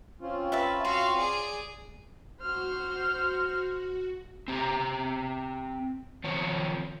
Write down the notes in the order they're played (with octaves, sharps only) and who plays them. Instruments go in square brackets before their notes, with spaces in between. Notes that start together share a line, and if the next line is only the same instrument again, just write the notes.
[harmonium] C4 C#4 F4
[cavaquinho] B4 E5 A5
[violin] F#4 F5 [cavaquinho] C6
[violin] G#4 D5
[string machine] F#4 [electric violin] C5 F6
[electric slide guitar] C4 G4 G#5 A#5
D#3 F3 C4 C#5